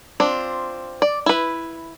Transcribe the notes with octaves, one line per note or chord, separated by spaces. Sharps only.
C4 D4 F4
D5
E4 B4